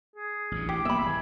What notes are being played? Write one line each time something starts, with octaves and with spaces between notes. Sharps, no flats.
G#4
A1 D2 A#2
G4 D6
C2 A#3 B3 E5 B5
G#1 E3 G#5